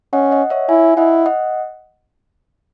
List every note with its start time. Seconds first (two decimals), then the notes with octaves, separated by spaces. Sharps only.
0.13 C#4 D#5 F#5
0.32 D#5 F#5
0.50 C#5 E5
0.69 E4 E5 G#5
0.97 E4 D#5 F#5
1.26 D#5 F#5